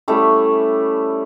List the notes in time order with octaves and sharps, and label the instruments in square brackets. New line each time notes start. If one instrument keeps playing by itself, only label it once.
[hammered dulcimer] G3 A3 C#4 E4